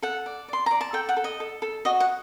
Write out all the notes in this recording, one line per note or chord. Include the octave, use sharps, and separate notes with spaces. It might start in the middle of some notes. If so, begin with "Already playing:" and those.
A4 F#5
D5
D5 C6
D5 A#5
A5
A4 G5
F#5
A4
D#5
A4
A4
F#4 D#5
F#5